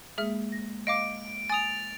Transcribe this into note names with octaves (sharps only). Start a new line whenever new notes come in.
G#3 A#3 G#4 E5 F6
A#6
D#5 F5 D6 D7
G#5 D#6 A6 F7